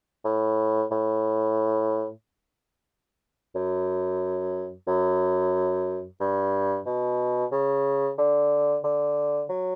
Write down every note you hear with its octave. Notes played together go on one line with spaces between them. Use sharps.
A2
A2
F#2
F#2
G2
B2
C#3
D3
D3
F#3